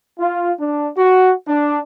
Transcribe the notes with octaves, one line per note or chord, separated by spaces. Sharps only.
F4
D4
F#4
D4